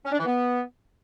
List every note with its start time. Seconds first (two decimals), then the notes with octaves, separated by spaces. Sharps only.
0.05 C#4
0.12 D4
0.19 E3
0.26 B3